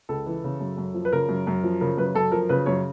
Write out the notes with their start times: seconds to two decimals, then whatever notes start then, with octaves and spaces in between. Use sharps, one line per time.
0.09 C#2 A4
0.26 E3
0.44 C#3
0.60 F#2
0.78 F#2
0.94 F3
1.05 B4
1.13 C#3 A#4
1.29 F#2
1.47 F#2
1.64 F3
1.81 C#3 A#4
1.97 F#2 B4
2.15 F#2 A4
2.32 F3 A#4
2.49 C#3 B4
2.66 F#2 C#5